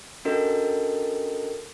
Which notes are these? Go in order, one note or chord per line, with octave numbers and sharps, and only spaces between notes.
C#4 D4 F#4 A4 A#4 D#5